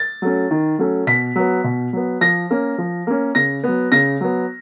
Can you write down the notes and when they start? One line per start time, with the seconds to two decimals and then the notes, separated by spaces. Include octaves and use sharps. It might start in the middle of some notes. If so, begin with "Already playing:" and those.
Already playing: A6
0.22 F#3 A3 C#4
0.51 D#3
0.79 F#3 A3 C#4
1.07 B2 B6
1.36 F#3 B3
1.64 B2
1.93 F#3 B3
2.21 F3 A#6
2.50 A#3 C#4
2.78 F3
3.07 A#3 C#4
3.35 C#3 A#6
3.63 F#3 B3
3.92 C#3 A#6
4.21 F#3 B3